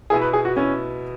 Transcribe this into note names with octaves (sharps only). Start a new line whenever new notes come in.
B2 B3 E4 G#4
B4
G#4
F#4
B2 B3 C#4 E4